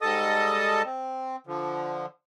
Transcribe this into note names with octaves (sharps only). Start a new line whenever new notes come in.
G#2 G3 A4 D#5 A5 D#6
C4
D3 F3